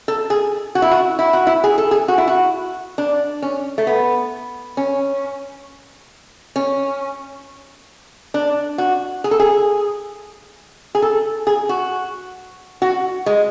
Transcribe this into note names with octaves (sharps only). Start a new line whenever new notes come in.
A4
G#4
F#4
E4
F#4
E4
F#4
E4
G#4
A4
G#4
F#4
E4
F#4
D4
C#4
A3
B3
C#4
C#4
D4
F#4
G#4
A4
G#4
G#4
A4
G#4
F#4
F#4
G#3